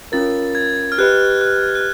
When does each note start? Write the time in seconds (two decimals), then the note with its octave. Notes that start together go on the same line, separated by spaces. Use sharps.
0.12 C#4 F4 A#4 A6
0.55 G#6
0.92 F6
0.98 G4 B4 D#5 F#6
1.41 F#6
1.75 F#6